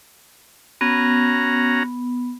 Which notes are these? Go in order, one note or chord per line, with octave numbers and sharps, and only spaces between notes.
B3 C#4 F#4 A#5